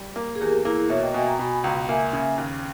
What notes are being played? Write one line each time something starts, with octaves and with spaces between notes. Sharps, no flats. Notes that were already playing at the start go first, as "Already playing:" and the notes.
Already playing: G3
A#3
G#4
E2 G4 A#4
A#3 E4 G#4
B2 C#5 E5
D#5 G5
B2 E5 G#5
G5 A#5
B2 G#5 B5
C#2 G5 A#5
A#3 E5 G#5
C#3
D#2